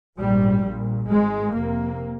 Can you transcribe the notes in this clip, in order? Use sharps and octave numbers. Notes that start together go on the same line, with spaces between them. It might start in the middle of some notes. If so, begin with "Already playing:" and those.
A#1 G#2 G3
A#1 A#2
G#1 G#2 G#3
F1 F2 C3 A#3